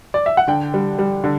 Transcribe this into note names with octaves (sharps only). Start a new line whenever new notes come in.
D5
E5
F#5
D3 G5
G3
G3
D3